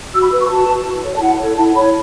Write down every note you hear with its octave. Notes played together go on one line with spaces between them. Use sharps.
F#4 E6
B5
B4 E6
C#6
F#4 A5
B4
E4
A4 C#5
A5
E4 F#5
A4 C#5
E4 A5
C#5 B5